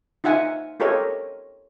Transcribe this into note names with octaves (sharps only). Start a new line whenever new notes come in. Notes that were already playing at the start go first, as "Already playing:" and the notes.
D#4 F4 E5 F#5 G#5
F4 G4 A4 A#4 C#5 D#5